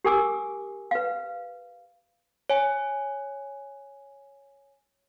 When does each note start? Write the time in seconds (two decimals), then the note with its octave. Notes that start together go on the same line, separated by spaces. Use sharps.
0.05 G4 A#4 G#5 D6 E6
0.91 B4 F5
2.50 C#5 G#5